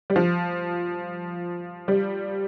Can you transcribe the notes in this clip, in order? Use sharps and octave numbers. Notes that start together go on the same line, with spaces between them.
G3
F3
G3